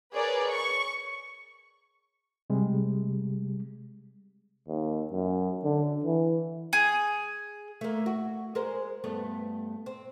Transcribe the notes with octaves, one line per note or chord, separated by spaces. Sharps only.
G#4 A#4 B4 C#5 D5
C#6
C3 G3 G#3
D#2
F#2
D3
E3
G#4
A3 A#3
F#4
G#3 A#4 C5
G2 A3 B3
C4